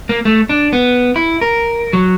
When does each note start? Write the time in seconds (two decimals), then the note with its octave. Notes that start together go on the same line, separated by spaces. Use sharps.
0.09 A#3
0.25 A3
0.49 D4
0.73 B3
1.16 E4
1.41 A#4
1.93 F#3